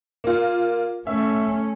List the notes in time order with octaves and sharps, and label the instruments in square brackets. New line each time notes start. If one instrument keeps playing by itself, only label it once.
[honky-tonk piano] A#3 F4
[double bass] A3 C#4 [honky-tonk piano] E5